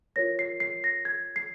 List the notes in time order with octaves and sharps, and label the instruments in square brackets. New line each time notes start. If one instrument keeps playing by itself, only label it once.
[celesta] F4 A#4 C#5 A#6
C7
C7
A#6
G#6
C7